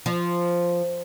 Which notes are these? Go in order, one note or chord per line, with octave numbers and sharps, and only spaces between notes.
F3